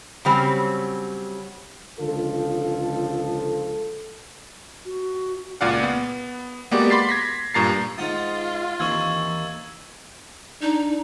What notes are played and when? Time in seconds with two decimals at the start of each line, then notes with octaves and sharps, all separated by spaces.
0.25 C#3 F#3 G3 C4
1.99 C#2 D3 F3 F4 A4
4.86 F#4
5.61 C#2 A#2 D5 F5 F#5
5.83 B3
6.71 G#3 A#3 B3 F#4 G4 D5
6.90 B5 C6 D6 A6 B6 C7
7.09 G#6 A#6 B6
7.54 G2 A#2 A#5 A6 C7
7.98 G#2 F4 F#5 D#6 A6
8.80 D#2 E3 A#3 C4 C#6 E6 G#6
10.62 D4 D#4